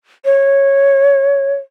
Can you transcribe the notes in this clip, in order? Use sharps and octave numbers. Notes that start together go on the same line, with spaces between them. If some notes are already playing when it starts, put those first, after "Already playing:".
C#5